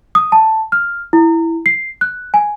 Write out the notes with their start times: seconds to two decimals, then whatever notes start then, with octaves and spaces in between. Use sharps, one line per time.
0.15 D#6
0.32 A5
0.72 F6
1.13 E4
1.66 C7
2.01 F#6
2.34 G#5